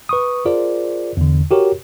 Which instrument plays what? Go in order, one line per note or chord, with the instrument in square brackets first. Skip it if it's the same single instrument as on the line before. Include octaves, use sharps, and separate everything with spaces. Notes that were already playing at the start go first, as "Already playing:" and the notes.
[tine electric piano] B4 C#6 D#6
F4 G#4 A#4 C5 D5
E2 D3
F#4 G4 A#4 C#5